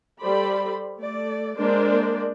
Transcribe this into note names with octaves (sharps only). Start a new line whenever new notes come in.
G3 A4 C5 D5 B5
A3 D5
G#3 A#3 D4 A#4 C5 D5